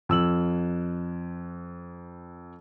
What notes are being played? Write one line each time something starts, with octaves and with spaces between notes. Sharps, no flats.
F2 E6 F#7